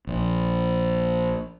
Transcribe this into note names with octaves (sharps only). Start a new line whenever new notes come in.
A#1